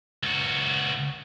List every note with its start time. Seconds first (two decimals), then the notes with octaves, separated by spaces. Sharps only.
0.23 C#2 F#4